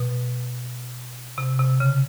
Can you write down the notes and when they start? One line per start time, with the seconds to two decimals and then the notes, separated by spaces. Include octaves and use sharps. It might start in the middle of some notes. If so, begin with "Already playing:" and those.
Already playing: B2
1.38 C3
1.59 C3
1.80 C#3